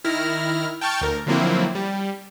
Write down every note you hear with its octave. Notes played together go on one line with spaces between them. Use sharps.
D#3 E4 F6 A#6
G5 A5 C#6 F6 G6 A6
D2 A#4
D3 F3 F#3 A#3 C4 E4
G3